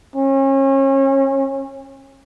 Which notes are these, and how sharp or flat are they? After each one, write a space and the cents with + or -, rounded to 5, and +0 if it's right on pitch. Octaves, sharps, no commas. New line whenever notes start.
C#4 -35